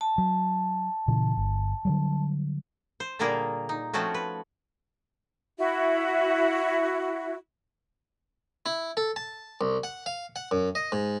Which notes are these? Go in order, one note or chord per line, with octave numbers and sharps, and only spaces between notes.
A5
F#3
A#2 C#3 E3
G1
D3 F#3 G3
C5
A#2 D3 G3 A#3 G#4 A#4
D#4
F3 A3 C4 C#4 F#4
B4
E4 F#4 E5
E4
A4
A5
C2
F#5
F5
F#5
F#2
D#5
G#2